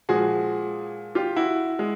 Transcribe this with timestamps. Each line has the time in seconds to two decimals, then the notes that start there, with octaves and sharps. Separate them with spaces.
0.09 A#2 F3 G#3 F#4 G#4
1.15 F4 G4
1.36 E4 F#4
1.79 G#3